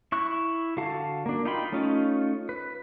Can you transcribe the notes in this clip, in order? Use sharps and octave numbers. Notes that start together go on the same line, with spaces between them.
E4 C#6 F#6
D3 F#4 F5 A5
A#3 D4
D#4 F4 G5 B5 C6
A3 C#4 D#4 F4
B4